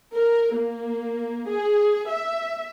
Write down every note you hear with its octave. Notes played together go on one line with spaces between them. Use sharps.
A#4
A#3
G#4
E5